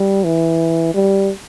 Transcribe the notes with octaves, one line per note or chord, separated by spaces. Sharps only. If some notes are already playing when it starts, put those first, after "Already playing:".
Already playing: G3
E3
G3